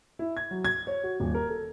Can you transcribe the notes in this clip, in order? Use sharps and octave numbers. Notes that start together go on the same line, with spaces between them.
E4
G#6
F#3
G#6
C#5
F#4
D#1
A#4
A4